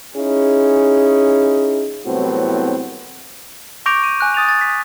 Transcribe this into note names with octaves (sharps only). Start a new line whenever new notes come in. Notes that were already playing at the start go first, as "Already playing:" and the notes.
C#4 D#4 E4 G#4
C2 A2 F#3 B3 C4 F#4
C#6 D6 G6 A#6 D7 F7
D#7
G#5 F#6
D#6 A6 D#7 F7
A6
B6